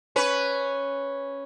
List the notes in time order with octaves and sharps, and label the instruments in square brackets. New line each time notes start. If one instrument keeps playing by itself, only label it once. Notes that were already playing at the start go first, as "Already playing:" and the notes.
[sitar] C#4 B4